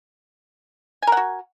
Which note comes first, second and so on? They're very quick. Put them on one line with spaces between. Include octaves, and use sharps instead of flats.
G#5 A#4 F#5 F#4